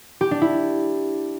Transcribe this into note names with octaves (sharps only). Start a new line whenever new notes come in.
G4
D4
E4